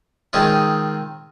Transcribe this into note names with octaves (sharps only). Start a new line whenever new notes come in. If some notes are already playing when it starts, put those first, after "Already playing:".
D#3 G#3 C4 F4 G#4